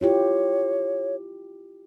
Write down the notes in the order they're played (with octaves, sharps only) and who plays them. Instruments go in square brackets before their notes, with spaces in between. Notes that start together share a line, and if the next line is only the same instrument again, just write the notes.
[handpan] E4 F4 G4 [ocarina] C#5